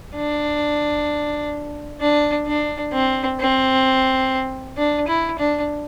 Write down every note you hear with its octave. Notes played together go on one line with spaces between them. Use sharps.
D4
D4
D4
C4
C4
D4
E4
D4